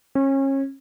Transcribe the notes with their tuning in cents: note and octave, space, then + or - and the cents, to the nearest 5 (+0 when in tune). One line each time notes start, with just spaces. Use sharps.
C#4 -30